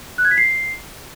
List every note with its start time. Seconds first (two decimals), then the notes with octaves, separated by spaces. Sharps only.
0.18 F#6
0.25 G#6
0.31 B6
0.38 C7